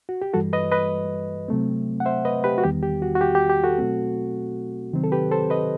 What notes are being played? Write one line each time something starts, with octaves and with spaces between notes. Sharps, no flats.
F#4
G4
G2 E3 G3 F#4 A4
B4 D#5
B4 D#5
C3 F#3 A3 C4
F#5
C5 E5
B4 D#5
G4 B4
F#4
E2 D#3 G3 B3 G4
G4
F#4
F#4
G4
G4
G4
F#4 A4
B2 F#3 A3 C4
C3 D#3 F#3 C4
A4
G4 B4
A4 C5
B4 D#5